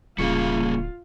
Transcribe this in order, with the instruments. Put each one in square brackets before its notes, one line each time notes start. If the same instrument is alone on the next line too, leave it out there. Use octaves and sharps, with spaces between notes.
[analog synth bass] D1 [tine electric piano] C#3 C#6 C#7 [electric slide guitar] G3 A#3 F5 [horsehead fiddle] F4